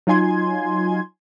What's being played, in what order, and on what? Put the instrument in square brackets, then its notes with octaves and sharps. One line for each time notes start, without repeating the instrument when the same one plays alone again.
[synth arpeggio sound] F#3 D#4 F4 G#5 C6 G#6